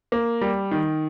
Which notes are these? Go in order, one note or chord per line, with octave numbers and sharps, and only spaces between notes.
A#3
G3
D#3